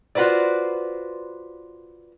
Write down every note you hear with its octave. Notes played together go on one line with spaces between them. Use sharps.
F4 F#4 B4 C5 D5